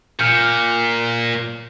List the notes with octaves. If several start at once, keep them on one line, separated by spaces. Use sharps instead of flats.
A#2 F6 G6 C#7